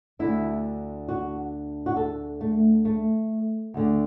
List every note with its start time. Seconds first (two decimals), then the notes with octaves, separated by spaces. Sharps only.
0.19 D2 D3 E4
1.08 F#4
1.86 F#4
1.96 A4
2.41 A3
2.85 A3
3.74 D2 D3